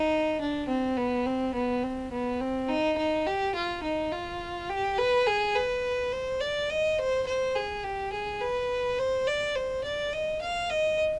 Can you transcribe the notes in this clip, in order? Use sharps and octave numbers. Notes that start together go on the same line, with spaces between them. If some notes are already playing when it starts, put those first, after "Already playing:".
Already playing: D#4
D4
C4
B3
C4
B3
C4
B3
C4
D#4
D#4
G4
F4
D#4
F4
G4
B4
G#4
B4
C5
D5
D#5
C5
C5
G#4
G4
G#4
B4
C5
D5
C5
D5
D#5
F5
D#5